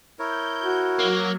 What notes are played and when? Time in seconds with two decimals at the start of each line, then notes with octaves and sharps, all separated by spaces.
0.19 E4 A#4 C#5 G6
0.63 F#4
0.99 F#3 A#3